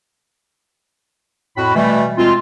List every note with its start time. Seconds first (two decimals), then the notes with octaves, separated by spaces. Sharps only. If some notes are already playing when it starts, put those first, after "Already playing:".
1.57 F2 A2 F#4 B5
1.75 B2 E3 G3 A3
2.18 B2 G#3 C4 F4